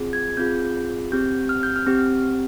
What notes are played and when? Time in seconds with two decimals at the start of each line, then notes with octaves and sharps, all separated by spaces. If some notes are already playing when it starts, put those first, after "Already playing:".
Already playing: C4 F4 G#4
0.13 G#6
0.37 C4 F4 G#4 G6
1.12 C4 G4 G6
1.49 F6
1.63 G6
1.76 F6
1.87 C4 G4